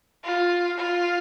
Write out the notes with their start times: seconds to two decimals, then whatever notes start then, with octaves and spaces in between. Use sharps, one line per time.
0.24 F4
0.77 F4